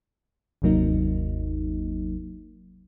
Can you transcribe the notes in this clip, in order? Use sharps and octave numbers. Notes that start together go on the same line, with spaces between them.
G1 D#2 C3 F#3 A#3 D#4